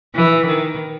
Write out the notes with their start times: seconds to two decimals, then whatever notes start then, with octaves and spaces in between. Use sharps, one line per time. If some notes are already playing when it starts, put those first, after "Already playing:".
0.15 E3
0.46 D#3